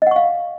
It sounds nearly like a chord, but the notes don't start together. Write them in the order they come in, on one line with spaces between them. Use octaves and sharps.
D#5 F#5 C#6 F5